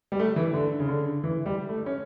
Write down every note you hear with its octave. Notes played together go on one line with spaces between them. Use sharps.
G3
A3
E3
D3
C#3
D3
E3
G3
A3
C#4